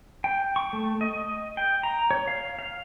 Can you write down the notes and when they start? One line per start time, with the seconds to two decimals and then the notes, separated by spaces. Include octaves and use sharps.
0.24 G5
0.56 C#6
0.73 A3
1.01 D#5
1.57 G5
1.83 A#5
2.11 C#5
2.28 F5
2.59 F5